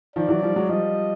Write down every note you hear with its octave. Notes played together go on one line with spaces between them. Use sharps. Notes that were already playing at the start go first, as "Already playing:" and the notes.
D#3 F3 D5
E3 F#3
F3 G3
F#3 G#3
F3 G3 D#5